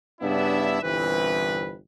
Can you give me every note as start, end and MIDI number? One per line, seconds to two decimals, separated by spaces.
0.21 0.78 43
0.21 0.78 49
0.21 0.78 59
0.21 0.78 62
0.21 0.78 64
0.21 0.78 76
0.82 1.76 31
0.82 1.76 36
0.82 1.76 52
0.82 1.76 60
0.82 1.76 71